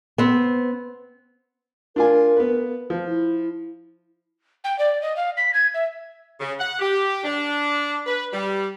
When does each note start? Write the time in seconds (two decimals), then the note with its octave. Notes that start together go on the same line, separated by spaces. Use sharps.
0.18 B3 C4
1.96 D4 F4 A#4 G#5
2.37 B3 B4
2.90 F3
3.07 E4
4.64 G5
4.78 D5
5.02 D#5
5.16 F5
5.37 B6
5.54 G#6
5.74 E5
6.39 C#3
6.59 F#5
6.79 G4
7.23 D4
8.06 B4
8.33 G3